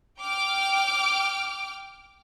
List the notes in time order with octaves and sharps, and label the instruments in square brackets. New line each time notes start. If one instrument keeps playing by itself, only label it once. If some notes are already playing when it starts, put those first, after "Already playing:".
[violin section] G5 D6 F6